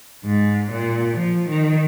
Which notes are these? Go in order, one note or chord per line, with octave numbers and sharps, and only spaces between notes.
G#2
A#2
F3
D#3